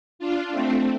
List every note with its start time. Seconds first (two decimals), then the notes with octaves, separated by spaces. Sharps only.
0.19 D4 F4
0.51 A3 C4